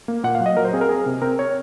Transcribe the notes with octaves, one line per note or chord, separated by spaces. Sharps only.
A#3
A#2 F#5
F5
F#3
D#5
F#3 A#4
C5
C4 G#4
A#4
C4 G#4
C3
C4 A#4
C#5